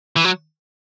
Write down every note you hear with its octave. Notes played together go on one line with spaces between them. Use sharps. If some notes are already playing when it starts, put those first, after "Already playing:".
E3
F#3